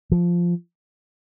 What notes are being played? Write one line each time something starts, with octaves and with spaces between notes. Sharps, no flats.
F3